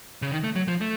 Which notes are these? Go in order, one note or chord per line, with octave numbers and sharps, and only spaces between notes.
C#3
D#3
A3
F#3
F3
A3